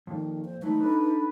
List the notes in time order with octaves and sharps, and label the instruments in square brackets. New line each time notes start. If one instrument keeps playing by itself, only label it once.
[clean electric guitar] F2 A#2 [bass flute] D#3
[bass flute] C5
[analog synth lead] E3 [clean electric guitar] F#3 A3 B4 [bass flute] D#4
[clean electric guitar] D4 A4 [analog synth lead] B4